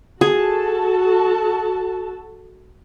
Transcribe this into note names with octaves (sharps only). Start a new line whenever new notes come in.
F#4 G#4 A4 A5